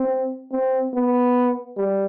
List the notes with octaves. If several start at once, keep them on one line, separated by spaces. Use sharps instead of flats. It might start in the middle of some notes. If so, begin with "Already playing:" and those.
Already playing: C4
C4
B3
G3